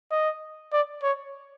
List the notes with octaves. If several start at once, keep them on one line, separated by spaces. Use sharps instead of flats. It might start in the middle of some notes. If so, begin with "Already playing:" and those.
D#5
D5
C#5